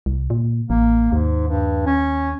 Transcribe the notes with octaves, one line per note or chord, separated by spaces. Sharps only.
C2
A#2
A1 A#3
D#2 G#2
G2
C#4